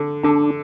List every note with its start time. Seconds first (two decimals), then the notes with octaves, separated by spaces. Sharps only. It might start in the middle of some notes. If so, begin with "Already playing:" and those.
Already playing: D3
0.24 D3 D4